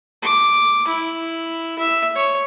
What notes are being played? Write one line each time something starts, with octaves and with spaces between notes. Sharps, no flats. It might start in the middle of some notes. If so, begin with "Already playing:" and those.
D6
E4
E5
C#5